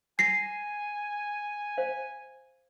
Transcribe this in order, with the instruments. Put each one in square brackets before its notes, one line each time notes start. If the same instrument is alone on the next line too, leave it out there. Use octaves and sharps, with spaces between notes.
[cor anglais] G#5 [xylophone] A#6 C7
[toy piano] C5 F5